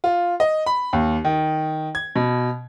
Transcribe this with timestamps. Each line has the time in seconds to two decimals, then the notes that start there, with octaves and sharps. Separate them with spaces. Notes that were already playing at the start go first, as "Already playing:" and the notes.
0.04 F4
0.40 D#5
0.66 B5
0.93 D#2
1.25 D#3
1.95 G#6
2.15 B2